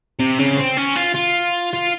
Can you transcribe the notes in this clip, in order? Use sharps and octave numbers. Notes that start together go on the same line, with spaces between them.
C3
C#3
C4
C#4
F4
F4
F4